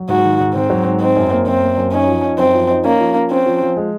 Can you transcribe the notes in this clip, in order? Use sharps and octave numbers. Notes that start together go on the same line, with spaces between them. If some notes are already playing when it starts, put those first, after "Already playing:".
Already playing: F#3
G#2 F#4
D#3
G#2
G#2 C4
F#3
G#2
C4 D#4
F#2
A#3
F#2 C4
A#3
F#2
C#4 D#4
F3
D#4
F#2 C4
F3
D#4
A#3 C#4
F3
C#4
C4 C#4
F3
F3
G#3